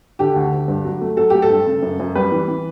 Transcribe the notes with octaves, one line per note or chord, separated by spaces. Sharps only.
D3 G4
D2
D2
G2
F#3
A3
F#3 A4
A3 G4
A4
G2
C#3
F#2
F#2
G3 B4
E3
E3